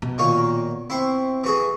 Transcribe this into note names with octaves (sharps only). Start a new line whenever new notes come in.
B2
A#2 D#3 A#3 C#5
C4 E4 C6 C#6
E3 F#4 G#4